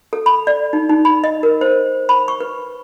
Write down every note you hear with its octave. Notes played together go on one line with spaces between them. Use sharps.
A4
B5
D5
D#4
D#4
B5
D#5
A#4
C5
B5
C#6
B4